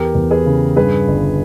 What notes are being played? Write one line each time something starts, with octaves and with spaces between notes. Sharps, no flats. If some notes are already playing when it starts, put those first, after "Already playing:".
Already playing: E2 G4 A#4
E2
G#4 B4
C#3
G2 G#4 B4
G1